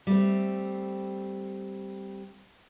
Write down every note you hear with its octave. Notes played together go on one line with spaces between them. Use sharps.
G3 A3 C4